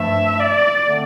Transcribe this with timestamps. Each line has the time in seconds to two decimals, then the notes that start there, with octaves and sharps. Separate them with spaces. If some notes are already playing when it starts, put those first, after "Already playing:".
Already playing: G2 F3 A3 E5
0.40 D5
0.88 D3 A3 C4